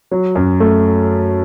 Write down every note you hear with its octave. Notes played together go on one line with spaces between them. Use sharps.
F#3
F#2
A3